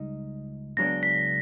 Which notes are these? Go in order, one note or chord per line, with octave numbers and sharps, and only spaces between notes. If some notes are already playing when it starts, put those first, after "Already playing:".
Already playing: C#2 G3 D#4
C#2 C#3 F#3 B3 D4 A#6
B6